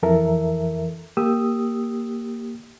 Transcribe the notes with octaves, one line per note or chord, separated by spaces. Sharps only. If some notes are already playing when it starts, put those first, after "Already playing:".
F2 E3 A4 A#4 E5
A#3 G4 D#6 E6